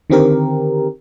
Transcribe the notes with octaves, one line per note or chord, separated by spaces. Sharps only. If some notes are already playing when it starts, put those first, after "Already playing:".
D3 D#3 C4 G4 A#4